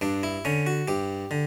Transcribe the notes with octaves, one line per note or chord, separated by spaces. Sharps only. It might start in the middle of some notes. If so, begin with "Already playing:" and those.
G2 D4
E4
D3 C#4
F#4
G2 G4
D3